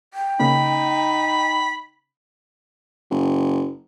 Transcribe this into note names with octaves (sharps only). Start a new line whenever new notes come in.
G5
C#3 A#3 D#4 B5
F#1